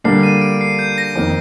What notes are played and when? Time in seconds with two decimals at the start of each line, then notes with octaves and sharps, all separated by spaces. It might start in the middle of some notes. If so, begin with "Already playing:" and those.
0.04 D3 G3 A#3 D4 C7
0.23 D#7
0.42 D7
0.61 C7
0.79 G6
0.98 A#6
1.15 F2 D#3 A#3 D#4